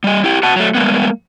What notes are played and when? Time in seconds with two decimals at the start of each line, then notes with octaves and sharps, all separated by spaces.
0.04 G3 D#5
0.24 E4 G4
0.43 F#4 F#5 A5
0.56 F#3 A3
0.75 G3 G#3 A#3 B3